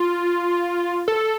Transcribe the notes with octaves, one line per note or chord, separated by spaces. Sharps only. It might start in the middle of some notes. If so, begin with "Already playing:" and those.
Already playing: F4
A4